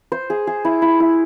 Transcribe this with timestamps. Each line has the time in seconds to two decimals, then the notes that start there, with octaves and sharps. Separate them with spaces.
0.12 C5
0.30 G#4
0.47 G#4
0.65 E4
0.82 E4
1.00 E4